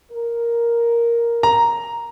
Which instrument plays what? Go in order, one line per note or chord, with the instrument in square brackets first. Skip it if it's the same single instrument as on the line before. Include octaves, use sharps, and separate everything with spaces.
[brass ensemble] A#4
[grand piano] A#5